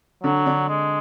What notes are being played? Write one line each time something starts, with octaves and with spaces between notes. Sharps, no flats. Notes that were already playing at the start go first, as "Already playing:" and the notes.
D3 F#3 D4
D3 D4
G#3